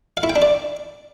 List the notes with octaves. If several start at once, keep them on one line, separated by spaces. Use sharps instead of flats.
F5
E4
G5
D4
D5